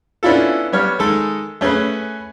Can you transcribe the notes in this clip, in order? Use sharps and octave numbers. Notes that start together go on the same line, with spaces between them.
B3 C#4 D4 E4 F4 A4
G3 B3 C#5 F6
D#3 G#3 A4
A3 C#4 G#4 B4